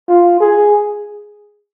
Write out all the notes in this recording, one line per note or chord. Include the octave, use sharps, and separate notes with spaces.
F4
G#4